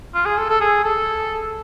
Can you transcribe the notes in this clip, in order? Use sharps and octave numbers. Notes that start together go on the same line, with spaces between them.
F4
G#4
A4
A4
G#4
A4